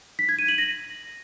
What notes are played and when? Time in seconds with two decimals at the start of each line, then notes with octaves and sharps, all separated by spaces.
0.19 B6
0.29 G#6
0.39 D#7
0.48 F#7
0.58 A#6